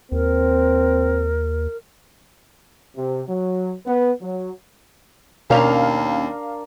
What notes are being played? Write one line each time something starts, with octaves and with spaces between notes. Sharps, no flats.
D#2 C4 A#4
C3
F#3
B3
F#3
D#2 B2 C#4 D4 A#4 F5 F7